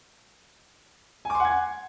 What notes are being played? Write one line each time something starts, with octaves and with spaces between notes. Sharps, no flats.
F#5 G#5 C6 D6 G#6